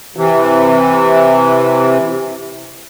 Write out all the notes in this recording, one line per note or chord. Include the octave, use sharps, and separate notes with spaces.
C3 E3